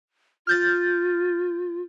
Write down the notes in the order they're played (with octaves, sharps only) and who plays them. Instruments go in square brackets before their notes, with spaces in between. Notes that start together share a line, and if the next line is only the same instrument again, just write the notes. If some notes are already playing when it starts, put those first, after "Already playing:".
[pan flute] F4 [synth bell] F6 G6 A6